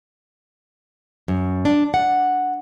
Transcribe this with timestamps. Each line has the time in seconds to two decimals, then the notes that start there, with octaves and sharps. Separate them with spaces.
1.28 F#2
1.65 D4
1.94 F#5